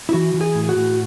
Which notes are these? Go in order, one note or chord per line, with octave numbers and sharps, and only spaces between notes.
E4
E3 F#4
E3
G#4
A2
G#4
F#4
A2